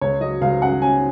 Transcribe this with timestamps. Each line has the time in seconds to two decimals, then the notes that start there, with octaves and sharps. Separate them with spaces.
0.01 C#2 C#5
0.21 F#3 D#5
0.41 C#2 F5
0.62 C#4 F#5
0.82 C#4 G#5